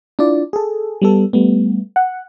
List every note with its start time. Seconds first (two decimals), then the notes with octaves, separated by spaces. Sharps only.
0.19 D4 E4 F4 D5
0.53 G#4 A4
1.02 G3 B3 A4
1.33 G3 A3 B3
1.96 F#5